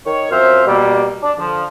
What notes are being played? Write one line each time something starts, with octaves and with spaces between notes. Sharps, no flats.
D#3 C#5
F#2 F3 C4 C5 E5 F6
B2 G3 A#3
D4
D3 F3